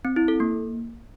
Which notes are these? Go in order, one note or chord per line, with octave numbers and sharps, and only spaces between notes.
C4
E4
A4
A#3